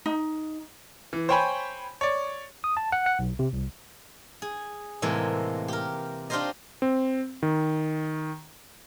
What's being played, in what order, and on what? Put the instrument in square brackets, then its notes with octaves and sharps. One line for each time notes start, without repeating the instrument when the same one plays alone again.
[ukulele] D#4
[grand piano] E3
C5 C#5 G5 G#5 B5
C#5 D5
[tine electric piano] D#6
A5
F#5
F#5
B1
C3
C2
[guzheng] G#4
A2 C3 E3 G#3 A#3
G4 A#4
D4 F4 G4 A#4 C5 D#5
[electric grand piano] C4
D#3